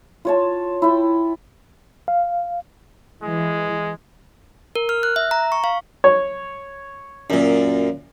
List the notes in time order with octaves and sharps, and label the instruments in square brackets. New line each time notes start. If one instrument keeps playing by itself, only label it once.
[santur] F4 C#5 A5
E4 G5
[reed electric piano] F5
[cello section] E3 [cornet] G#3
[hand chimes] A#4
F6
F#6
E5
A#5
C#6
F5
[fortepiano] C#5
[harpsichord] F#2 A#2